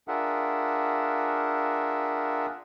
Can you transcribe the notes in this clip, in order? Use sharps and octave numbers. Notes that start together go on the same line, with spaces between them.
D4 F4 G#4 A#4 E5 F#5